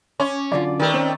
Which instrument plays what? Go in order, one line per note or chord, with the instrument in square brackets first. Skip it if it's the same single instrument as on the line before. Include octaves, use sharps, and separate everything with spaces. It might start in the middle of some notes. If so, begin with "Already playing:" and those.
[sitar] C#4 [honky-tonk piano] C#5 D6
[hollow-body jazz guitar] F#2 D3 F4 [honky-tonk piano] D5
[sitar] D#3 A3 [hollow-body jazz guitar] G4 B4
[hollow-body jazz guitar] C4 C#4 C5